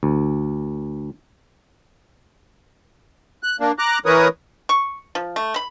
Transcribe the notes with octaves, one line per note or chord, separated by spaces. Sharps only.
D2
F#6
A#3 D4
A#5 D6 F#6
E3 A#4 B4 C#5 D#6
C#6
F3
A3
B5